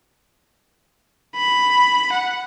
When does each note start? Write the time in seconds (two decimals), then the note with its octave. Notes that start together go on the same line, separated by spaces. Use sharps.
1.37 B5
2.13 F#5